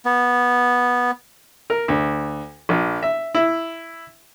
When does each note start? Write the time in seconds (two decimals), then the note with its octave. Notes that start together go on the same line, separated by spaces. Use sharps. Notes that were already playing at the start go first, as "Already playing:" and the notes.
0.05 B3
1.70 A#4
1.88 D2
2.69 A#1
3.03 E5
3.35 E4